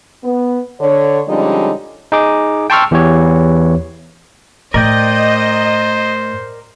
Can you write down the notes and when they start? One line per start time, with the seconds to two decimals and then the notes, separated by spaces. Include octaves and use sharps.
0.24 B3
0.80 D3 C#5
1.28 D3 F3 G3 G#3 C#4 D#4
2.12 D#4 G#4 D6
2.70 G5 A5 C6 C#6 E6 F6
2.91 E2 E3 B3 G4 C#5
4.74 A2 A#4 C5 D5 D#5 G5